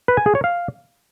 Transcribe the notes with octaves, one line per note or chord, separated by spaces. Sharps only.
B4
G#5
G#4
C#5
F5